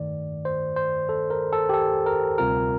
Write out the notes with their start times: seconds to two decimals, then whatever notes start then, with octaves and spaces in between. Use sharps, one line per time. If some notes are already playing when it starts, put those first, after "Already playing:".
Already playing: G2 D#3 A3 D5
0.45 C5
0.76 C5
1.09 A4
1.30 A#4
1.53 A4
1.69 G4
1.74 A4
2.06 A#4
2.38 D2 C3 G3 C4 F4 A#4